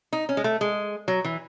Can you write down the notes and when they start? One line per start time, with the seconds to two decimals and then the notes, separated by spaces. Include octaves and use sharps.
0.13 D#4
0.29 C#4
0.37 G#3
0.44 A3
0.61 G#3
1.08 F#3
1.24 E3